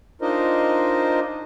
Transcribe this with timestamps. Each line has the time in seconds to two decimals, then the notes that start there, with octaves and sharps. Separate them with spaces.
0.21 D4 D#4 F4 A#4 C5 D#5